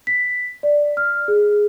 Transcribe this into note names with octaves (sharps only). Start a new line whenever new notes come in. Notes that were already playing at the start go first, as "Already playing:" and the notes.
B6
D5
F6
G#4